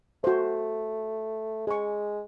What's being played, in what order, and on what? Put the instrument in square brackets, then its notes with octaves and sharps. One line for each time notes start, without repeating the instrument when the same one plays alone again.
[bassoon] A3 [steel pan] F#4 C5
[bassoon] G#3 [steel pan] G#4 C#6